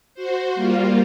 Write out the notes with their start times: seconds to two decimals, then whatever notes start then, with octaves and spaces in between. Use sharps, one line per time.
0.14 F#4 C5
0.55 G3 A#3 F4